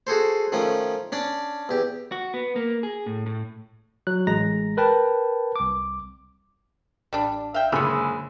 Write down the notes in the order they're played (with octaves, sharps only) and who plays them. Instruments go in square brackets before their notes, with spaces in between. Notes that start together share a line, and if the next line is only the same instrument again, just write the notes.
[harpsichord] F#4 G#4 A4 C5
D#3 F3 A3 C#4
C#4 D4 D5
E2 G4
[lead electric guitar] F#4
B3
A#3
G#4
A2
A2
[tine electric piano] F#3 F#6
A1 G#3 A#5 A#6
A#4 B4 G5 A5
C2 D6
[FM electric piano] A1 D5 [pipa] G3 D4
[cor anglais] E5 [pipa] F5 G5
[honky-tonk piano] F#1 B5 E6 [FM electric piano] A#2 D3 [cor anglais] G#3 [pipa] F4 C#5